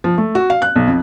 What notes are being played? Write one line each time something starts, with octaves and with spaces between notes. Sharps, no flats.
F3
A3
F#4
F5
F#6
B1
F2